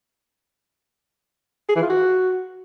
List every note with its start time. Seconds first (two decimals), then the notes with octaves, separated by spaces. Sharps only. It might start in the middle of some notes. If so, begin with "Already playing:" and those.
1.69 G#4
1.76 E3
1.82 F4
1.89 F#4